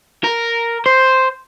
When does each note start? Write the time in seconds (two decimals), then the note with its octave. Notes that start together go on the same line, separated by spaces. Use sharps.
0.24 A#4
0.86 C5